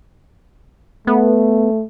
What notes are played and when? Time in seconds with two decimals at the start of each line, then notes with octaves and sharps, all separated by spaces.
1.07 A3 B3